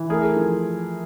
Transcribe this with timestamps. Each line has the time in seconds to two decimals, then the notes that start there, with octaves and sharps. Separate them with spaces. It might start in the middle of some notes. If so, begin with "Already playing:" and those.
Already playing: E3
0.10 A3 G#4 A#4
0.36 F3